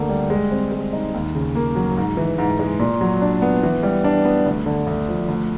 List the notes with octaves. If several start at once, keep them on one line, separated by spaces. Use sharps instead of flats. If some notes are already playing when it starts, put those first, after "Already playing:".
Already playing: D2 D3 A#3
G3
G#3
C4
G#3
D#4
D#2
C#3
A#3
F#3
G#2
E3
G#2
G#3
A#2
F#3
D4
B3
E3
G3
D4
B3
D2
D3
D2
F3
D2